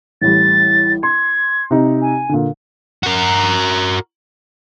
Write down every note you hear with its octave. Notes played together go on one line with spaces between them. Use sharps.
A1 A2 G3 A6
C6 G#6
C3 D#4
G#5
A#2 D3
F#4 A#4